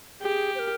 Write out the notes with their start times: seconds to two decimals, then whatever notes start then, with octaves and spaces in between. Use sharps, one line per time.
0.21 G4 G#4
0.55 C5
0.59 A#4